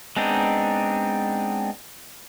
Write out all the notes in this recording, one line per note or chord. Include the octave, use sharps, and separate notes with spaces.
G#3 B3 C4 D4 D#4